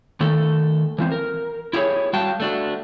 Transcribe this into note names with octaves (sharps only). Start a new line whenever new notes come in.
D#3 A3 A4
E3 F3 C4
A#4
E4 G4 G#4 C#5
G3 F#4 F5 G5 A5
A3 D4 F#4